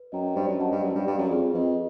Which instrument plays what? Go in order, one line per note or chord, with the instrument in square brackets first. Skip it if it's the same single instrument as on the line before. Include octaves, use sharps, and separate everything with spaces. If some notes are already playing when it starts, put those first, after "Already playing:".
Already playing: [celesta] B4
[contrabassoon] F#2 [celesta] D#5 G5 A#5
[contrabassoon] G2 [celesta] C5
[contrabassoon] F#2
[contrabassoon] F#2 [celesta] D#5 F#5 A5
[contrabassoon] G2
[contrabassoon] F#2 [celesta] B4
[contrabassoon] G2
[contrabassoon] G2 [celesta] D5 F5
[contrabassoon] F#2
[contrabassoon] F2 [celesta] G#4
[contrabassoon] F2 [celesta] B4 D#5